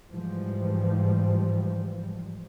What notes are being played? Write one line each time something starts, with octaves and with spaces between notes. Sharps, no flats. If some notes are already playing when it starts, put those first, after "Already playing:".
G#2 E3 F3 G3